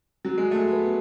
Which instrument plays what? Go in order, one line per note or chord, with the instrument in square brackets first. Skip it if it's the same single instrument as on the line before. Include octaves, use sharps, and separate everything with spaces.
[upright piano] F#3
G#3
A3
B3